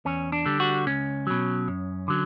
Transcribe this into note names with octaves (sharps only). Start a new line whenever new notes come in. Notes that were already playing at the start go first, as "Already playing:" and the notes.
E2 C#4
D4
D3 G3
F#4
C#2 C#4
B2 F#3
F#2
D3 F#3